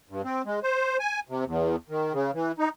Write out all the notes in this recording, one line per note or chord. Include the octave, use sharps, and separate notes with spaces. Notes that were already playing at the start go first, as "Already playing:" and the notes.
G2
C4
G#3
C5
G#5
C3
E2
D#3
C#3
E3
D#4